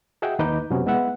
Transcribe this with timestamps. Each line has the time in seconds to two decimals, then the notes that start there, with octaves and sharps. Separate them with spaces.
0.22 F#4 G#4 D#5 E5 F#5 G5
0.39 D#2 D#4 B4 D#5 D6 G6
0.70 F2 C3 F#3 B3 C#4
0.86 G#3 B3 E4 E5 F#5